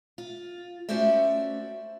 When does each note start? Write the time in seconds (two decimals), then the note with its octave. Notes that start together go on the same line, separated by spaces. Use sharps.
0.18 F4
0.89 A3 C#4 F#4 C5 D5 E5